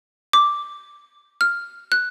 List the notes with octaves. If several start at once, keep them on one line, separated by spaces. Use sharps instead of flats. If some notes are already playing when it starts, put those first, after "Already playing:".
D6
F6
F#6